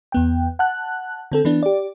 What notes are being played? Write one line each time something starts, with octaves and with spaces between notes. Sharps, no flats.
E2 B3 G5
F#5 A5 F#6
D3 C4 A4
E3 B3 D4
G4 D5